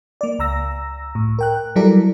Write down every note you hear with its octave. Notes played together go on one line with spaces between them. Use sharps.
A#3 D5
C#2 A#5 E6 A#6
A2
A#4 G5 F#6
F#3 G3 E4 A4 A#4 D5